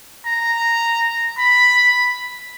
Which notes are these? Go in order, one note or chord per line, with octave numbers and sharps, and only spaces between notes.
A#5
B5